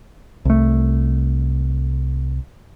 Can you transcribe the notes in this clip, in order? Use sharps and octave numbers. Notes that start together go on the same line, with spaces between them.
C2 A3